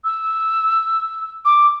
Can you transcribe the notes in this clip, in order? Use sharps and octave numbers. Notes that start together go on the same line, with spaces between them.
E6
D6